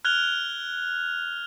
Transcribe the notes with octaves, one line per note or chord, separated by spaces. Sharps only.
F6 F#6 G#6 F7 G7